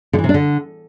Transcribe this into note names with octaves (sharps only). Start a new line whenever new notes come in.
D3
E3
C3
D4
D3